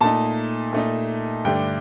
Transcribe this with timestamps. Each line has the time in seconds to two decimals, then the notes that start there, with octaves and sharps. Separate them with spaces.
0.01 A#2 A3 D#4 A5
0.73 A#2 A3 D#4
1.45 G2 D3 A3 D4 G5